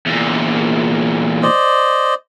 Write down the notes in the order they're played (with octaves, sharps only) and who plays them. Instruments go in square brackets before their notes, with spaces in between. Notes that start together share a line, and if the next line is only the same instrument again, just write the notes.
[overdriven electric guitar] E2 A#2
[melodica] C5 D5 D#5